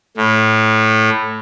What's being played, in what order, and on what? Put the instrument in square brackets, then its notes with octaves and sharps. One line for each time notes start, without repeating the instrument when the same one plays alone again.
[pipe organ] A2